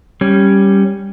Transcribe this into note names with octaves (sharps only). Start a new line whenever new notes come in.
G3 C#4